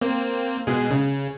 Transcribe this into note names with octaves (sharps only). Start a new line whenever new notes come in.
A#3 C4
B2 G#3 G#4
C#3